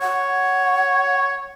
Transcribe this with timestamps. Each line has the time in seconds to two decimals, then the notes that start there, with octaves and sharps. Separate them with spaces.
0.01 C#5 F#5